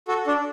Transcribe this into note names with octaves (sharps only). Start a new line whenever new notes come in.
F#4 A4
D4